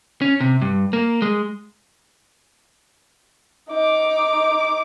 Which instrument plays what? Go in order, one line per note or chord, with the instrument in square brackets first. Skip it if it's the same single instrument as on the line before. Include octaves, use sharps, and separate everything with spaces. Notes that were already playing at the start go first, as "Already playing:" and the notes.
[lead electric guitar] C#4
C3
G2
A#3
G#3
[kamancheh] D#4 D6